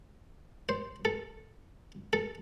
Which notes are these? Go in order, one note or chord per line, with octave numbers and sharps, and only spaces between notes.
C5
A4
A4